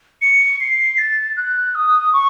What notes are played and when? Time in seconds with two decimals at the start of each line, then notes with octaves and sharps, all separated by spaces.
0.21 C#7
0.60 C7
0.98 A6
1.37 F#6
1.75 D#6
2.13 C#6